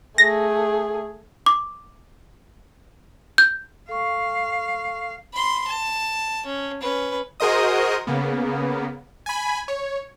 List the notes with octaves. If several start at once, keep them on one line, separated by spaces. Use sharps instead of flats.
A3 G#4 A#6
D6
G6
A4 F5 C#6
B5 C6
A5
C#4
C#4 B4
F#4 G#4 A#4 C5 D#5 D#6
C#3 A#3 B3
G#5 B5
C#5